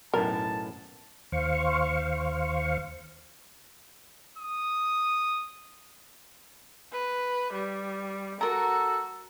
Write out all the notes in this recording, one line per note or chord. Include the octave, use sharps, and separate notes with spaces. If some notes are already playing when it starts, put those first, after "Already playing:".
B1 F#2 A2 A#4 A5
D#2 C5 F5 C#6
D#6
B4
G3
F#4 A4 A#4 A#5